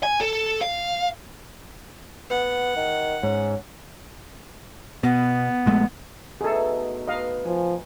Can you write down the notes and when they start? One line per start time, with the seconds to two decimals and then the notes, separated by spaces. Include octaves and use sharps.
0.03 G#5
0.21 A4
0.61 F5
2.30 B3 F#5
2.76 D#3
3.23 G#2 C#4
5.03 B2 B3
5.66 A#1 G#3 A3
6.41 B2 A3 D#4 G#4 A4
7.07 B4 D#5 F5
7.45 F3 G#5